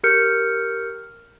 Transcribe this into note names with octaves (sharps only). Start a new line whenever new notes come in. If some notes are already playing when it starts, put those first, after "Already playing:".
G4 A#4 F6 G6 C#7